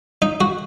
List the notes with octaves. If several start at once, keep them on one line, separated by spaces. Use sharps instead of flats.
D#4
F#4